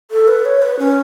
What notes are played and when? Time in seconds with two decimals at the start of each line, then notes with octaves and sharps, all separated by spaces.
0.11 A4
0.28 B4
0.45 C#5
0.62 B4
0.79 C#4